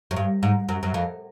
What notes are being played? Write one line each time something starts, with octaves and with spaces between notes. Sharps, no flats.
F#2
G2
G#2
F#2
F#2
F2